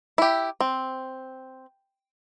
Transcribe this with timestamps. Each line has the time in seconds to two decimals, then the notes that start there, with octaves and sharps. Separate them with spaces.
0.18 E4 G4
0.61 C4